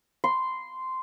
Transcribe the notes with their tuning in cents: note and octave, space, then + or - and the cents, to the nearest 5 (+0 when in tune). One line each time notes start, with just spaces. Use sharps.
C6 -10